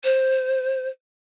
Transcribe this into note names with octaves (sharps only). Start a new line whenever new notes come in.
C5